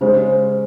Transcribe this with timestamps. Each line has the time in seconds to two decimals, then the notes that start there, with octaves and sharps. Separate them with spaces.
0.01 C#3 G#3 C#4 C5
0.26 C5